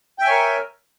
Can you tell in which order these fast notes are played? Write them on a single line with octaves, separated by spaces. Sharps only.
G5 E5 G#5 C#5 A#4